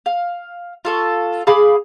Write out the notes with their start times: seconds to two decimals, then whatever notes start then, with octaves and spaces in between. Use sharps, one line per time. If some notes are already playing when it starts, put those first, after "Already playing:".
0.06 F5
0.85 F4 A4 C#6
1.47 G#4 F5 B5 D6